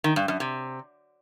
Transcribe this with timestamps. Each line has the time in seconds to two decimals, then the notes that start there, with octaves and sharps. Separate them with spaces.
0.04 D#3
0.16 G2
0.28 F#2
0.40 C3